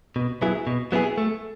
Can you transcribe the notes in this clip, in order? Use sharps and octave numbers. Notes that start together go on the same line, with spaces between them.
B2
F#3 B3 E4 G#4
B2
F#3 B3 E4 G#4
A3